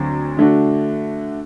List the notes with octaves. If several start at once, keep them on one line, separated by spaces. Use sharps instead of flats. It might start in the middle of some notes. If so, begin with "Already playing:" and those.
Already playing: D2 F#3 C4
D3 A3 D4 F#4